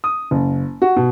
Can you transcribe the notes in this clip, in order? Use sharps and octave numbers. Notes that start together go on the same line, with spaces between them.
D#6
F#1
F#4
B2